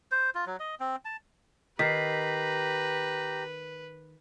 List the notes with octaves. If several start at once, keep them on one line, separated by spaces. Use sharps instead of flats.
C5
F4
F#3
D#5
C4
A5
D#3 G4 B4 A#5 B6 C7